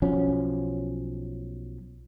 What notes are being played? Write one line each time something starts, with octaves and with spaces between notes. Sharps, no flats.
B1 F3 F#3 C#4